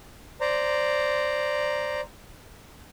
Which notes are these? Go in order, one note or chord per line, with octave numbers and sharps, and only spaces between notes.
C5 D5 A#5